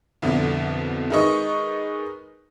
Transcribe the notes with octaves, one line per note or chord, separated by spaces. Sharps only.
C2 F2 B2 D3
D#3 G#3 D#4 B4 D#5 C#6